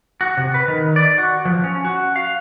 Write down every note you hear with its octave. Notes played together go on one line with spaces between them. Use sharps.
F#4
C3
B4
D#3
D5
F#4
F3
C#4
F#4
F5